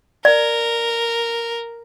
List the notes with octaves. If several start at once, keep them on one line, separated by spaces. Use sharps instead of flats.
A#4 D5